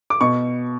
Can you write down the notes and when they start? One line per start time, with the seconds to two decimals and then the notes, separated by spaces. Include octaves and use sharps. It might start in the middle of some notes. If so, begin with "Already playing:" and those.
0.10 D6
0.21 B2 C#6